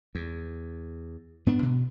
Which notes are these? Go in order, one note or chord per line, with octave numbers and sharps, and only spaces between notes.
E2
G#2 B3 D4
B2